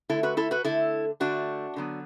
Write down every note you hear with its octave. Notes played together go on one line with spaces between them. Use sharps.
D3 A3 E4 A4
F#4 B4
E4 A4
F#4 B4
D3 A3 E4 A4
D3 A3 D4 F#4
D3 F#3 B3